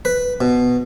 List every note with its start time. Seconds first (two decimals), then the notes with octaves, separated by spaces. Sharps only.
0.05 B4
0.41 B2